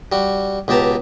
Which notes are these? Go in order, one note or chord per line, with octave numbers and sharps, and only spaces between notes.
G3 F#4
C#2 B2 G4 A5 A#5